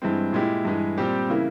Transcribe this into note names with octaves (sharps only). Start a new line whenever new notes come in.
G2 E3 G#3 C4
A#2 G#3 E4 G4
G2 E3 G#3
A#2 G3 C4 G4
C#3 E3 A#3 E4